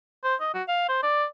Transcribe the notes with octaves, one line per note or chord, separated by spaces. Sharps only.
C5
D#5
F#4
F5
C5
D5